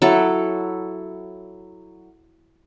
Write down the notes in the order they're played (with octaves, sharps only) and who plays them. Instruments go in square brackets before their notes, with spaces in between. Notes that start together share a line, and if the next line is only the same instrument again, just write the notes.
[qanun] F#3 E4 A4